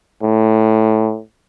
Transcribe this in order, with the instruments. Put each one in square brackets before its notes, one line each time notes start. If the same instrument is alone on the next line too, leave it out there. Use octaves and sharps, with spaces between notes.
[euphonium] A2